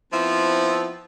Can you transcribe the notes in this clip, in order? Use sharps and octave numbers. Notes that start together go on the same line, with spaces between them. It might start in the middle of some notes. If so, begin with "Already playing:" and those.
F3 B3 C4 E4